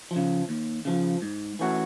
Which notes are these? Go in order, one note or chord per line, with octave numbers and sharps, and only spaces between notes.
F3
C#3
D#2
C#3 F3
G#2
E3 A3 C#4 F#4